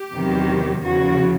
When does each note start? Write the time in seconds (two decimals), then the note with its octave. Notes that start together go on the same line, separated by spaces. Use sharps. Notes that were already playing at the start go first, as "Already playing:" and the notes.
Already playing: G4
0.15 E2 C3 D#3 F#3
0.84 E2 C#3 F3 F#4